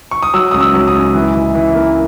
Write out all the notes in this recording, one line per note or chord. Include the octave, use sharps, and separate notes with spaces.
C#6
D#6
F#3 E6
C#2 D#6
E6
F#3
D#6
C#2
E3
E3
E3
A#3